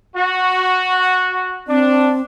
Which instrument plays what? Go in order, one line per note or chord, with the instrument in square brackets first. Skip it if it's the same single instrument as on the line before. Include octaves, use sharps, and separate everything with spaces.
[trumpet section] F#4
[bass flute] C4 [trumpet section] D4